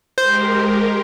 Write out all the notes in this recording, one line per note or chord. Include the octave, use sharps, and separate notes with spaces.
G#3 G4 A#4 C5